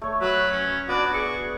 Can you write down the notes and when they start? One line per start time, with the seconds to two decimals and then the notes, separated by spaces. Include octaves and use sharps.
0.02 A3 C#5
0.21 F#3 B4
0.51 C#4
0.89 B3 D4 F#4 D5
1.14 G#4 C#6